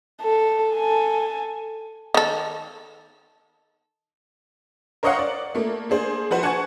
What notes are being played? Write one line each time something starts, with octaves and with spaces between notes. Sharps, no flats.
A4
A4 G#5
D#3 A4
A#4 C5 C#5 D#5 F5 F#5
D5
A3 A#3
A#3 D4 G#4 C5
F3 F#4 B4 C5
F#5 G#5 A5 C#6 G#6